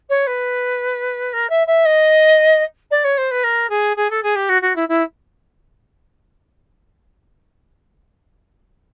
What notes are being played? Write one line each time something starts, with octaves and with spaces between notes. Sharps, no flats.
C#5
B4
A#4
E5
E5
D#5
D5
C#5
C5
B4
A#4
G#4
G#4
A4
G#4
G4
F#4
F#4
E4
E4